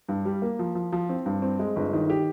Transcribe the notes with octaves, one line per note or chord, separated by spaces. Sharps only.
G2
G3
A#3
F3
F3
F3
C4
G2
C4
G#3
G1
D#3
G4